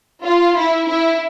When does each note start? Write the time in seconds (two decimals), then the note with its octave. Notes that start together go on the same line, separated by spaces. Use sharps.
0.24 F4
0.56 E4
0.87 E4